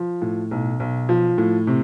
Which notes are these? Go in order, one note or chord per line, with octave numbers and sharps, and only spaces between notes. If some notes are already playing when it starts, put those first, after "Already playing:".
Already playing: F3
A2
B1
B1
F3
A2
C3